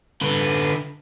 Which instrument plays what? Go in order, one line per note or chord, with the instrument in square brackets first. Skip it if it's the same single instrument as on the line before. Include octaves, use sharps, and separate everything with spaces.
[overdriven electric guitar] D3 B4